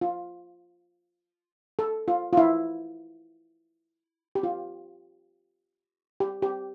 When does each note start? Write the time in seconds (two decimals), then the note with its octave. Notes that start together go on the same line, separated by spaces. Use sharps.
0.01 F4
1.79 A4
2.08 F4
2.33 F4
2.37 E4
4.35 G4
4.43 F4
6.20 G4
6.42 G4